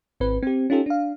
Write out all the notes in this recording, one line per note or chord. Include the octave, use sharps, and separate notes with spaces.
G#1 C4 B4
C4 G4
C#4 D#4 F4 G4 A4
D4 F5